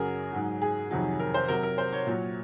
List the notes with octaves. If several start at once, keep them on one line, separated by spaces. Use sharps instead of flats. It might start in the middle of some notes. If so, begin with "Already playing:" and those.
Already playing: F#2 C#3 F#3 F#4 G#4 A#4
G#2 F#3
G#4
F2 C3 D#3 F#3
A#4
C5
C3 F#3 A#4
A#4
C5
C#5
A#2 F#3